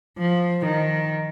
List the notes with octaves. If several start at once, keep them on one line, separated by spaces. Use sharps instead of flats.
F3
D#3